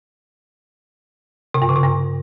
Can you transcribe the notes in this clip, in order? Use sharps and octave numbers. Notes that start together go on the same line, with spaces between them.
C3
G2
C#3
C3
G2